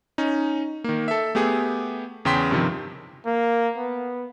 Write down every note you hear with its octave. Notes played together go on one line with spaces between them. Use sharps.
C#4 D#4
D#3 A#3
A4 E5
A3 B3 G4 G#4
E2 C#3 G5 C6 B6
G2 C3 D#3 F3
A#3
B3